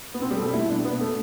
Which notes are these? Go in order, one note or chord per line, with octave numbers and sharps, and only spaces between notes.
B3
B2 C4
G3
A3
B2
E4
B2 D4
B3
B2
A3